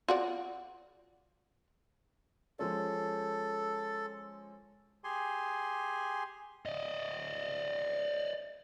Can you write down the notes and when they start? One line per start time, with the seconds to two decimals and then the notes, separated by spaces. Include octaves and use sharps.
0.08 F4 F#4 D5
2.59 F3 G#3 C#4 A4
5.04 G4 G#4 G#5 C6
6.66 D5 D#5